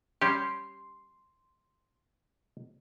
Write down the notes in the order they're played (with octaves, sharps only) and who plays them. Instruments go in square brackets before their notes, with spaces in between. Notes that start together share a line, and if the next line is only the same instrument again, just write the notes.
[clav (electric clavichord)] G3 C#4 G4 [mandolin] C6